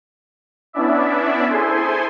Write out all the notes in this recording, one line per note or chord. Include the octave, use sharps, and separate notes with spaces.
B3 C#4 D4 E4 D5 E5
E4 G#4 A4 C5 G#5 C6